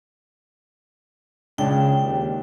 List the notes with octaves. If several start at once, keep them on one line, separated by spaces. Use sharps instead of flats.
C#2 C#3 D4 G5
D#2